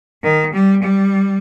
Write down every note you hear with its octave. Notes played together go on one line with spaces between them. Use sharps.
D#3
G3
G3